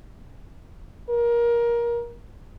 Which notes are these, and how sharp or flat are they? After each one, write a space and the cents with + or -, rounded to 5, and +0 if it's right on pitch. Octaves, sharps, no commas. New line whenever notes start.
A#4 +20